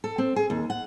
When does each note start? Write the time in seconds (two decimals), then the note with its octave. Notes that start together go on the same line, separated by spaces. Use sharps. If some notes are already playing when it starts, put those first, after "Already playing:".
0.04 A4
0.18 C4
0.36 G#4
0.50 D#2
0.70 F#5